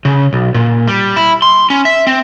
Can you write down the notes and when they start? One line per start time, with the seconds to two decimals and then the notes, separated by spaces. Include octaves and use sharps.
0.05 C#3
0.33 B1
0.54 A#2
0.88 G3
1.16 E4
1.42 C6
1.70 C#4
1.85 E5
2.07 C4